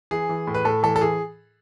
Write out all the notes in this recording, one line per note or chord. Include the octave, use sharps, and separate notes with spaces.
E3 G#4
E3
A2
B4
A2 A4
E3 A4
A4
E3 G#4